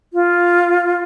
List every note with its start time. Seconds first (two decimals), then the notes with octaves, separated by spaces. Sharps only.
0.13 F4